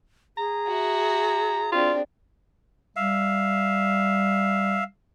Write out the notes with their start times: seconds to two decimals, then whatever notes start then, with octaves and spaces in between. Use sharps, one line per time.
0.38 G#4 A#5
0.67 F#4 E5
1.72 C4 D4 F4
2.96 G3 E5 F5